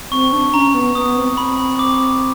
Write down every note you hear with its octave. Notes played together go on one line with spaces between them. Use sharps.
C4 C#6
D4
C#4 A#5
B3
B3 D#6
C4
B5
D6